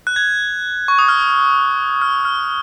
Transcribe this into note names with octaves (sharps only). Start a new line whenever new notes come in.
F#6
G#6
C#6
D#6
F6
F6
F6